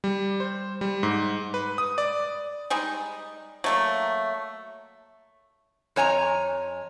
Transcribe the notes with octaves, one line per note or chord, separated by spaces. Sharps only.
G3
C5
G3
G#2
B4
D#6
D5
G3 G#3 D#4
F#3 A3 A#3
F2 C#5 G#5 A#5